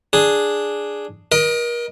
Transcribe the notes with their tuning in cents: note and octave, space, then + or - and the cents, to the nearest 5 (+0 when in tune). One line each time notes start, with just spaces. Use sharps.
D4 +0 G#4 +0
A#4 +35 D#5 +0